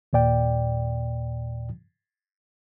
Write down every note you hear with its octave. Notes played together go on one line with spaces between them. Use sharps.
D#2 A#2 D5 G5